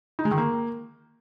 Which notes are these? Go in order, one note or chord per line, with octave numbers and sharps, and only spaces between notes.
D#4
G#3
D#3
A#3